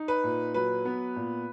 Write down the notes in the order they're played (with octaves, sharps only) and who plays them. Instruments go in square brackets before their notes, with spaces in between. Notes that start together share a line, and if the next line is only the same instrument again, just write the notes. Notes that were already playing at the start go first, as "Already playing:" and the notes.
Already playing: [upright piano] D#4
B4
A#2
F#3 B4
B3
A#2